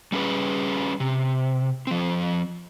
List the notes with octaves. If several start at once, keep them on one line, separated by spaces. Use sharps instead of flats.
G3 C#4 G#4 B4
C3
F3 C4